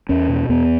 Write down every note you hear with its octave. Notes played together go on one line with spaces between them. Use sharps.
E2 C#4
B2
E2 B3